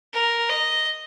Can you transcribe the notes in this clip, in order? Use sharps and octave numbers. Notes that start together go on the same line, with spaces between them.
A#4
D#5